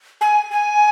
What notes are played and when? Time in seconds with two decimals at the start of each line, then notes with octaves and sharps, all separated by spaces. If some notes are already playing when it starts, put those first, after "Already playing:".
0.21 G#5
0.51 G#5